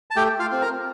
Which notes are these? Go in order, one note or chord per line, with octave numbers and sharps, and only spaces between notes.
A5
A3 G4 G5
F4 F5
C4 F4
A#4 A#5